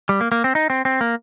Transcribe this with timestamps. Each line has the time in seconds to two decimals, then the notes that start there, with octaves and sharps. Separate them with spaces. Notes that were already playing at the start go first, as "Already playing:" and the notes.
0.09 G3
0.21 A#3
0.32 A#3
0.44 C4
0.55 D#4
0.70 C4
0.85 C4
1.01 A#3